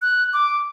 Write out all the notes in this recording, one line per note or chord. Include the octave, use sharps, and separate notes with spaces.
F#6
D6